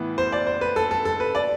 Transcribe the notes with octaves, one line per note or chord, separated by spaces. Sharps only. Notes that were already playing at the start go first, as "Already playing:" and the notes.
Already playing: A2 E3 B3
C5
D5
C5
B4
A4
A4
A4
B4
D5